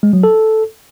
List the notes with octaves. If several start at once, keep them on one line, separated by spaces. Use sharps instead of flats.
G#3
F#3
A4